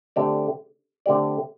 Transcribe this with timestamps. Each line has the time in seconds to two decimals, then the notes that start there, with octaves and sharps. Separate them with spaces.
0.16 D3 A3 C4 G4 D5
1.06 D3 A3 C4 G4 D5